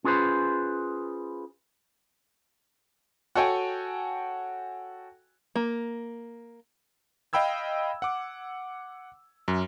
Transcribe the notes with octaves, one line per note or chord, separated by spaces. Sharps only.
C#4 F4 G#4 B4 C5
F#4 A4 C#5 G5 G#5
A#3
D#5 F5 G5 B5 E6 G#6
F#5 D6
F#2